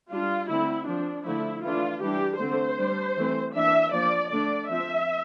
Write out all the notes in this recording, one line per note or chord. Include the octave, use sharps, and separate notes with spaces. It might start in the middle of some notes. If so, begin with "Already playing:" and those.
G3 D4 F4
D3 A3 C4 E4
F3 C4 D4
D3 F3 A3 E4
E3 A3 D4 F4
E3 G3 D4 G4
D3 A3 C4 C5
G3 D4
E3 A3 C4
E3 A#3 D4 E5
F3 A#3 D4 D5
D3 A3 D4 D5
F3 C4 E5